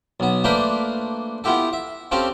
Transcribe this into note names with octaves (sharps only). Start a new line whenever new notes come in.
B1 B3
A3 A#3 D4 F4 B4 C5
B3 E4 F4 G4 A4
E5
C4 C#4 F4 G4 A4